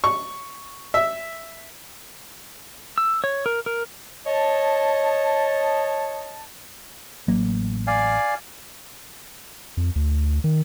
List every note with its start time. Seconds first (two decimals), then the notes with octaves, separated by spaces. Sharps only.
0.04 C#6
0.94 E5
2.98 E6
3.24 C#5
3.46 A#4
3.66 A#4
4.26 C#5 D#5 A5
7.28 A1 F#3 A#3
7.87 D5 F5 G#5
9.77 F2
9.96 D2
10.44 D#3